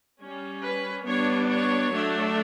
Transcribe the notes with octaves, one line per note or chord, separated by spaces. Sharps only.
G3 C#4
B4
G3 B3 D4 C#5
C#5
F#3 A3 D4